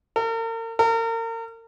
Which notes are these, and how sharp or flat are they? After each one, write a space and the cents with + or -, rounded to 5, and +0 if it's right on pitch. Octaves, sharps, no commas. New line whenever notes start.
A#4 -40
A#4 -35